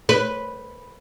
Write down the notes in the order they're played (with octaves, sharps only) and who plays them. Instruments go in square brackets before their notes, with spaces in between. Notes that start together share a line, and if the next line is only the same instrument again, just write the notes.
[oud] B4